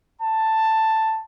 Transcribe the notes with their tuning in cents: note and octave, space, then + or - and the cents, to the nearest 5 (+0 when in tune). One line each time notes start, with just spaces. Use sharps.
A5 +5